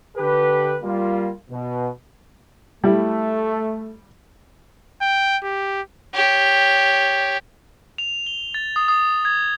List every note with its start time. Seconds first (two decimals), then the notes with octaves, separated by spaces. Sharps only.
0.17 D3 G4 A4 B4
0.83 G3 A#3 F4
1.50 B2
2.84 G3 A3 E4
5.02 G5
5.44 G4
6.14 G4 C#5
7.98 F7
8.27 G7
8.54 A6
8.76 D#6
8.88 D#6
9.25 G#6